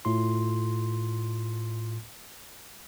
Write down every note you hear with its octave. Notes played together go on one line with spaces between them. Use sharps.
A2 F4 C6